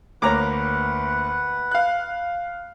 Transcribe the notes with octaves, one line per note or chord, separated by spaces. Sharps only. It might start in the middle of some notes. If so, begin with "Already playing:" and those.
D2 A#3 B4 C#5 F#5 A#5 D6
F5 F#6